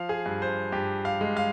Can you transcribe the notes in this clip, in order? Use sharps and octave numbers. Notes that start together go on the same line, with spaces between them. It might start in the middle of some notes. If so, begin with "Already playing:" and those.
Already playing: F3 F5
G#4
G2
C5
G2 G4
F5
G#3
F5